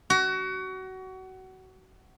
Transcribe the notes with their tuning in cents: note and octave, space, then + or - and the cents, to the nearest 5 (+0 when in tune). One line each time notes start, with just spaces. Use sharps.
F#4 +25